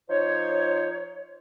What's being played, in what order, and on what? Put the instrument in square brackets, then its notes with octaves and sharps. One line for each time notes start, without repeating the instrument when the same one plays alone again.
[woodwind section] F3 D#4 F4 C5 C#5